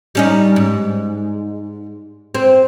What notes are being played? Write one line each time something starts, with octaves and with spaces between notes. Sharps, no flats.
G3 C#4 D#4
G#2
C4